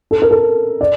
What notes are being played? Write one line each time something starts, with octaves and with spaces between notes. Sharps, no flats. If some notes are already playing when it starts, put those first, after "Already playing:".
A4
A#4
A4
D5